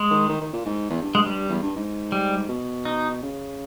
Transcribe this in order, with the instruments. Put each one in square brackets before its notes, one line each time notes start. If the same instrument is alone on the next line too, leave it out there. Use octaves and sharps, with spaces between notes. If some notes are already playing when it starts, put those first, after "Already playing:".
Already playing: [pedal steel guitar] G#3
[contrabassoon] D#3
D#3
D#3
A#2
G#2
E2
G2
[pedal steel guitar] G#3
G3
[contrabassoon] E2
G2
G#2
[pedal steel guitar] G3
[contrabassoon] B2
[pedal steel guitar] D#4
[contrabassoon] C#3